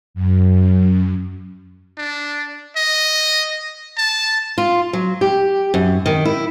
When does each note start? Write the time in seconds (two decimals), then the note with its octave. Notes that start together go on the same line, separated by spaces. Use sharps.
0.14 F#2
1.97 D4
2.76 D#5
3.98 A5
4.58 F4
4.93 F#3
5.21 G4
5.74 F#2
6.06 D#3
6.25 E4